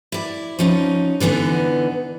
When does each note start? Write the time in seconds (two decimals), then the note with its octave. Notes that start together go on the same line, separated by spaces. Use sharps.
0.12 E4 D5
0.59 F3 C#4 D#4
1.20 D3 E3 B3 D#4